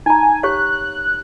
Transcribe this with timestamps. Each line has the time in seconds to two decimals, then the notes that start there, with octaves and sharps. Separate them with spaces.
0.06 D#4 G#5 A#5
0.43 G4 C#5 F5 F#6